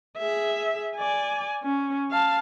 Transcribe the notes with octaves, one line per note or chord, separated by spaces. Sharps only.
G#4 E5
D5 G#5
C#4
F5 A5